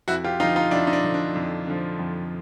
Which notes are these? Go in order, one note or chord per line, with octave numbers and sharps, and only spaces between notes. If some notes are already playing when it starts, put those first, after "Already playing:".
F2 E4 F#4
F4 G4
D3 F3 D#4 F4
D#4 F4
F2 D4 E4
D#4
D4
D3 F3
D4
F2
D3 F3
F2